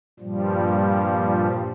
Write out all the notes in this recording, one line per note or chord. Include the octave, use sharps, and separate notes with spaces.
G2 A#2 F3 G3